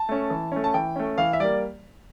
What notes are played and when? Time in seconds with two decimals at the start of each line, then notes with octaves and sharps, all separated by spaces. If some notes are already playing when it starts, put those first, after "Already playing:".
Already playing: A5
0.09 A3 C#4
0.30 E3
0.52 A3 C#4
0.64 A5
0.74 E3 G5
0.96 A3 C#4
1.18 E3 F5
1.33 E5
1.40 G3 A#3 D5